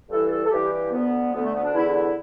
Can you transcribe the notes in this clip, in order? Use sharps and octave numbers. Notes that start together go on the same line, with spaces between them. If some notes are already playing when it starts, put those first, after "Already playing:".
G2 E3 A4
A4
A4
G2 E3 G4
G4
D2 D3 B3
D2 D3 B3
A3
B3
D4
E2 D3 E4
E4